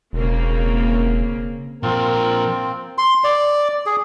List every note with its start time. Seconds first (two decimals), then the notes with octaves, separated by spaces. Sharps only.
0.13 E1 C#3 A#3 C4
1.83 A#2 F3 C4 F4 A#4
2.98 C6
3.24 D5
3.86 G#4